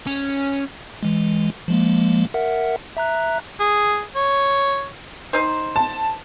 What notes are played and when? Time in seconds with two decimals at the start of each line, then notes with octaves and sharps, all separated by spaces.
0.07 C#4
1.03 E3 G#3
1.68 F3 G#3 A#3
2.34 A#4 E5 F#5
2.97 E5 A#5 F#6
3.60 G#4
4.16 C#5
5.33 D#4 C5
5.76 A5